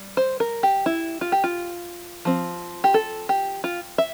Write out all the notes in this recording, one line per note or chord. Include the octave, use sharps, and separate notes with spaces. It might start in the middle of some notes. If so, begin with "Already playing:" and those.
Already playing: G3
C5
A#4
G4
E4
F4
G4
F4
F3 C4
G4
A4
G4
F4
E5